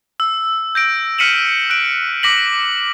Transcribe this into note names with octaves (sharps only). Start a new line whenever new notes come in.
E6
G6 A#6 D7
F6 B6 C#7 D#7 E7 F#7
F#6 D7
D6 A#6 B6 F#7